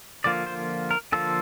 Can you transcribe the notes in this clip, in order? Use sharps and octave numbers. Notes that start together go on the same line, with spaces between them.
D3 F3 A#3 F4 D5
C5
A#4
D3 F3 A#3 F4 A4